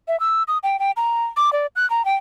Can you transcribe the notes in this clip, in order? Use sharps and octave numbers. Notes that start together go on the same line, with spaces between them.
E5
E6
D#6
G5
G5
A#5
D6
D5
F#6
A#5
G5